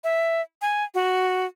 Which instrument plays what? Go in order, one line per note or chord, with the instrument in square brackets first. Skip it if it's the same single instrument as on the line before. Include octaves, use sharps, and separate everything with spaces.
[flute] E5
G#5
F#4